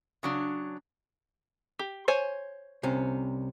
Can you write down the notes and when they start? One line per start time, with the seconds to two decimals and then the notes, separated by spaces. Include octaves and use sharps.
0.23 C#3 F#3 D4
1.79 G4
2.08 C5 C#5 G#5
2.83 C2 C3 C#4